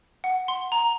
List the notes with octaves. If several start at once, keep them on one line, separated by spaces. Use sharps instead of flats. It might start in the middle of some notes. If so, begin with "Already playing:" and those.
F#5
C6
A#5